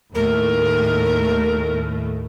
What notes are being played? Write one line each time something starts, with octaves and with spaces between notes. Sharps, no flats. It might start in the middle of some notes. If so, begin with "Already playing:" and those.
D#2 A2 A3 A#4